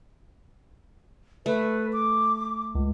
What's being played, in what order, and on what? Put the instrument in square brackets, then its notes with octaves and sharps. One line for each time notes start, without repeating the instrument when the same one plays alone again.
[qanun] A3 [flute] B4
[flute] D6
[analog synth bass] C#2